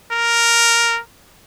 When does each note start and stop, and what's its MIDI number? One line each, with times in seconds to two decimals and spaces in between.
0.12 0.99 70